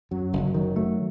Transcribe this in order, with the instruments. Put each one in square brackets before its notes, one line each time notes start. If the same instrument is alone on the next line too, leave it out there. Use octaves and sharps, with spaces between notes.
[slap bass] F#2 [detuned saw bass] F#3
[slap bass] F#1
[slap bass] D#3 [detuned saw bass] F#3
[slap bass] A3